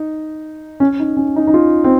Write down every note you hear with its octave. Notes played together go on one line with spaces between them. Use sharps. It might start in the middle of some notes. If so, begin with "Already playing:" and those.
Already playing: D#4
C#4
D#4
C#4
D#4
D#4
F4
C4